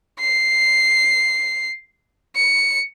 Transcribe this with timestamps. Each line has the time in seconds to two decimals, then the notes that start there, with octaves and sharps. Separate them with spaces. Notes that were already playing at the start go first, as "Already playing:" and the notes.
0.20 C7
2.36 C#7